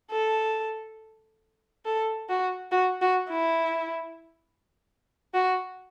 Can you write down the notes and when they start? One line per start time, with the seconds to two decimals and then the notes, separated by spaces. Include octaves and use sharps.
0.11 A4
1.85 A4
2.29 F#4
2.71 F#4
3.01 F#4
3.30 E4
5.34 F#4